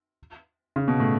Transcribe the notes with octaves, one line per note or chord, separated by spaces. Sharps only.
C#3
B2
A2